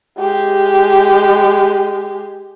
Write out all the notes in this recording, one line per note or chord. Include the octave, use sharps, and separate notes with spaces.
G#3 G4